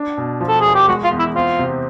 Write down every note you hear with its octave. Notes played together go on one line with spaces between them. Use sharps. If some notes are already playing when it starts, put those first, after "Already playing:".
Already playing: D4
B2
F3
A4
E1 G#4
G4
G#3 F#4
F4
E2
E4
C4 F4
C3